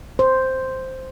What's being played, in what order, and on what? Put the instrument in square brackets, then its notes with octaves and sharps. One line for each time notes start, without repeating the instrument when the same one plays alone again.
[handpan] C5